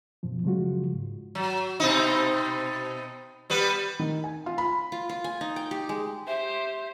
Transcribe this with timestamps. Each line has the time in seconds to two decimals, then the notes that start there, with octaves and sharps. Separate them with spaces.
0.23 F#2 B2 F3
0.44 C#3 F3 F#3 G#3 F4 F#4
0.94 G#2
1.35 F#3
1.80 B2 C4 D#4
3.50 G3 B3 B4
3.99 D#3
4.24 G#5
4.46 F4
4.58 B5
4.92 F4
5.09 F4
5.24 G#5
5.41 D#4
5.56 G5
5.71 G4
5.89 G#3
6.27 G4 C5 E5